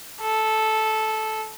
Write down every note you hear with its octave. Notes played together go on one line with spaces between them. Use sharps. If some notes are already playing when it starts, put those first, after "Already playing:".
A4